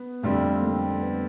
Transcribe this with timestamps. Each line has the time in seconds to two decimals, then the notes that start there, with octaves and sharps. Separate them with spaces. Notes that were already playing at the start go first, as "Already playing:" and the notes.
Already playing: B3
0.23 F2 D3 G3 A3 C4
0.62 A#3
1.00 B3